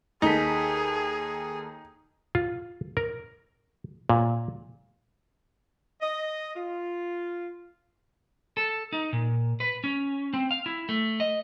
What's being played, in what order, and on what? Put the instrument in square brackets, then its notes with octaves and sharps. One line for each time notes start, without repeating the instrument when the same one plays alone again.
[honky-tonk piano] D#2 A4 B6 [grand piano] D#4 [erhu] G#4
[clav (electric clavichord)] F4
A#4
A#2
[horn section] D#5
F4
[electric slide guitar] A4
D#4
A#2
B4
C#4
C4
F5
E4
A3
D#5